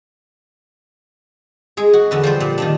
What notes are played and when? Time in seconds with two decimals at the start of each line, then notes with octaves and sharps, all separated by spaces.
1.77 G#3 G#4
1.93 F#4
2.11 E2 D3 B4
2.23 F3 G3 C5
2.40 A#2
2.58 D#3 F3 D4